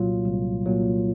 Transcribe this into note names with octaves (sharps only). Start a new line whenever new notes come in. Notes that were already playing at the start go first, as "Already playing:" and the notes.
Already playing: C2 A#2 F#3 F4
C2
A#2 F#3